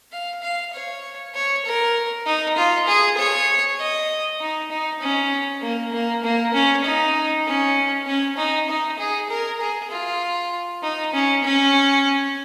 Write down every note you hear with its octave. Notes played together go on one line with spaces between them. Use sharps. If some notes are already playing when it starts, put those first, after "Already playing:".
F5
F5
C#5
C#5
A#4
D#4
F4
G#4
C#5
D#5
D#4
D#4
C#4
A#3
A#3
A#3
C#4
D#4
C#4
C#4
D#4
D#4
G#4
A#4
G#4
F4
D#4
C#4
C#4